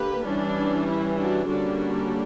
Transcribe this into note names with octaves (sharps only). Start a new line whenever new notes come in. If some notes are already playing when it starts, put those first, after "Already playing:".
Already playing: D3 A#3 G4 B4
E3 G3 C#4 D4
E4
D4 F#4
D3 G3 A#3 C#4 D4 F#4